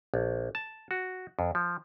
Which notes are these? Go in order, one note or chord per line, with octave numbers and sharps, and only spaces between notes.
A#1
A5
F#4
F2
F3